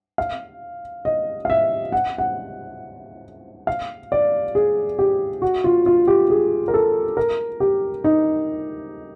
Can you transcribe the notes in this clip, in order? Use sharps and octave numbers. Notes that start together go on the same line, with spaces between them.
F5
D#5
F5
E5
F#5
F#5
F5
D5
G#4
G4
F#4
F4
F4
G4
G#4
A#4
A4
A#4
G4
D#4